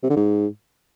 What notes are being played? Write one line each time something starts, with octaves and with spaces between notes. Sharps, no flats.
C3
D3
G#2